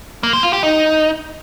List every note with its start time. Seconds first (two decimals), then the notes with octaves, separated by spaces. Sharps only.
0.23 A#3
0.33 C5
0.43 F4
0.53 G4
0.63 D#4